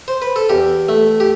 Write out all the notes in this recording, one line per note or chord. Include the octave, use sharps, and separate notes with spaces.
C5
B4
A4
E2 G4
A3
G4